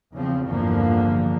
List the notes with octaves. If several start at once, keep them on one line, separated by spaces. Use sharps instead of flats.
E2 C#3 F3 C4
G1 E2 A2 D3 F3 A#3